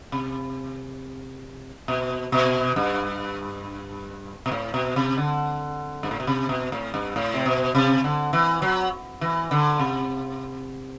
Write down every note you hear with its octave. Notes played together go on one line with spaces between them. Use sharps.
C3
B2
B2
G2
B2
A2
B2
C3
D3
G2
A2
B2
C3
B2
A2
G2
A2
C3
B2
C3
D3
E3
F#3
E3
D3
C3